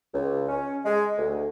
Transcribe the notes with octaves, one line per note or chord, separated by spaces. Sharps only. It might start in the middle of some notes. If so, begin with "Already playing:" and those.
C#2
C#4
G#3
D2